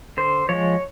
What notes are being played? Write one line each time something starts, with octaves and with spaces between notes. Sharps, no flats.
D3 C5
F3 G#3 C#5